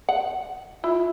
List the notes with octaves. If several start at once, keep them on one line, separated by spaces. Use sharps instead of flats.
F#5
E4 F4